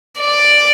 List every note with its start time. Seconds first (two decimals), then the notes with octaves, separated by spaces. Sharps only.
0.21 D5